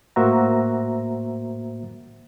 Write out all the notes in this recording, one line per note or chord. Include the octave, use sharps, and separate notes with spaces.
A2 A#3 F#4 C5 E5 A#5